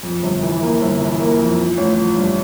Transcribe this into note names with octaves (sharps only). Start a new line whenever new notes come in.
F2
G1
E3
A#3
G1
E3
A#3
F2
F3
A1
F3
G2